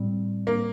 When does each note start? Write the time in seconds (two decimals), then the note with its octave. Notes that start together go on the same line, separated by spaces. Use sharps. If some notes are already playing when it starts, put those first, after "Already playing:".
Already playing: A2 G3 C4
0.47 A#3